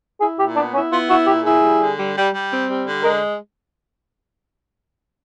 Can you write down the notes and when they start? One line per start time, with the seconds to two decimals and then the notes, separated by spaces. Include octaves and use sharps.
0.20 E4 G#4
0.39 A#2 G4
0.56 B3 D4
0.74 C#4 E4
0.91 B3 F4
1.09 E4 F#4
1.26 A#2 G4
1.44 E4 G#4
1.63 G3
1.80 D3
1.97 G3
2.16 G3
2.33 G3
2.50 C4
2.68 G3
2.87 D3
3.03 G#3 A#4